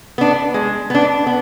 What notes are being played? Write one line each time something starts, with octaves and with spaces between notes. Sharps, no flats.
B3 D4
G#3
B3 D4
B3